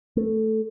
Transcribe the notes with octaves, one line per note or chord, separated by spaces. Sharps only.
A3